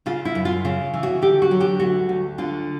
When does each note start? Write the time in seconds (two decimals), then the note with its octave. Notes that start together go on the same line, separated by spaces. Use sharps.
0.06 C#3 F4
0.25 E4
0.35 F#2
0.45 F4
0.65 C#3
0.94 E3
1.03 F#4
1.22 D3 G4
1.42 F#4
1.51 F#3
1.60 G4
1.80 D2 F#4
2.09 D2
2.38 D3 F4